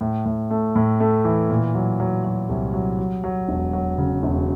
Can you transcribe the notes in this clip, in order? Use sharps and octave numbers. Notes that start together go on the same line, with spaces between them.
A2
A2
A3
A2
A3
E3
A#2
F#3
F#3
F#3
C2
F#3
F#3
F#3
E1
F#3
C#3
E1